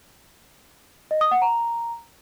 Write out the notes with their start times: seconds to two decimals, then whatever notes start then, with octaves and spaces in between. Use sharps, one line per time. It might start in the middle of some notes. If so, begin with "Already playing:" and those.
1.11 D#5
1.21 D#6
1.31 F#5
1.42 A#5